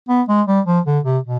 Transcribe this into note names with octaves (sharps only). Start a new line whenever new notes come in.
B3
G#3
G3
F3
D3
C3
B2